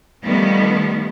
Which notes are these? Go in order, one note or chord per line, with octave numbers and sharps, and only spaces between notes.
D#3 F3 G3 A3 B3